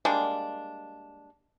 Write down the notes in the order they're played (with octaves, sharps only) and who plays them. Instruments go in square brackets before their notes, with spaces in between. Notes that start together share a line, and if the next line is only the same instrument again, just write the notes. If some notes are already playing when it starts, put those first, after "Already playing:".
[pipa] G3 G#3 A#3 D4